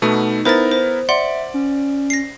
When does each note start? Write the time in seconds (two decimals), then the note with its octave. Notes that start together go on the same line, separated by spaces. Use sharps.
0.02 B2 A3 B3 D#4
0.45 B3 E4 A#4 C5 A6
0.71 C5
1.09 D5 E5 F#5 C6
1.54 C#4
2.10 A#6 C7